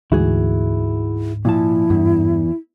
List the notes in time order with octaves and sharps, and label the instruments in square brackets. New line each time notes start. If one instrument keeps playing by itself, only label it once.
[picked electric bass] D2 E3 [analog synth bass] G#2 [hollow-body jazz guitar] E4 F#4 G#4
[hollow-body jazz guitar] A#2 F3 A5 [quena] E4
[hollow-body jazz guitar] E2 [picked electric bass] G2